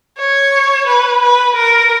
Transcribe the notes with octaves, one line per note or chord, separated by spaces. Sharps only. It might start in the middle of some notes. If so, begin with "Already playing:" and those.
C#5
B4
B4
A#4